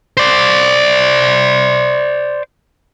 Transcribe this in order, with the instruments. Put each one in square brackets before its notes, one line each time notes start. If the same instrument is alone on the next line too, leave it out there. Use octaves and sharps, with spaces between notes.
[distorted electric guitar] C5 D5